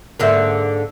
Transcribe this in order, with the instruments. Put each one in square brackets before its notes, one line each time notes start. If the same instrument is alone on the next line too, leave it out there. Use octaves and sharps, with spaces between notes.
[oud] G#2 D3 A#3 [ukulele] G#4 C5 E5